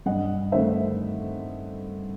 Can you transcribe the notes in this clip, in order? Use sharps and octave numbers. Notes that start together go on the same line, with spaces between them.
G2 D#5 F#5
D#3 A3 C4 C5 E5